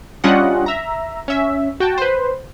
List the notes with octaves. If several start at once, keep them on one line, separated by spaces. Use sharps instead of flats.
G3 C#4 D4 F4 D#5 F#5
E5 A#5
C#4 E5
F#4 G5 A5
B4 C5